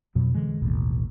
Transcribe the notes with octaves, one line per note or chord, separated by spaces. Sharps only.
F2 B2 F#3
D3 E3 G#3
A1 D#2 B2